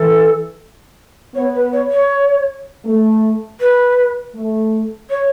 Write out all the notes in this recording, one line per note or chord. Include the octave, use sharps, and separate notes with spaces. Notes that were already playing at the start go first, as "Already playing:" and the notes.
Already playing: E3 A4
B3 C#5
B4
C#5
C#5
A3
B4
A3
C#5